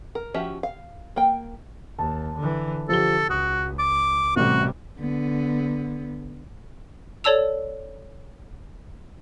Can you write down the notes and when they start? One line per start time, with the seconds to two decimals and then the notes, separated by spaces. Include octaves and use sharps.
0.15 A#4
0.34 F3 C#4 F#4 G4 E5
0.63 F5
1.16 A#3 G5
1.99 D#2 A5
2.38 D3 E3
2.89 D3 F3 G4 A4 G7
3.30 C#2 F#4 D#6
3.79 D6
4.36 A1 C3 G3 F#4
4.99 D3 B3
7.24 A4 C#5 D5 A5 E6 F7